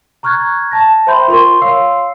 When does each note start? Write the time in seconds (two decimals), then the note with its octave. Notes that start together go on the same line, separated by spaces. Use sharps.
0.23 A#5 C#6 F6 F#6 G#6 A6
0.71 A5 A6 A#6
1.07 C5 E5 G5 B5 C6 G6
1.28 F4 A#4 C6 C#6
1.61 C#5 F5 C6 E6 C7